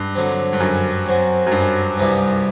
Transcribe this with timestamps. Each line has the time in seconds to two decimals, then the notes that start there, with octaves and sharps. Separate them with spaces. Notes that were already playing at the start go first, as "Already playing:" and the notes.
Already playing: G2
0.15 D3 F#3 C4
0.53 G2
0.60 F#2
1.06 F#3 C4 F#4
1.47 F#2
1.51 G2
1.97 C2 C3 G3 B3 E4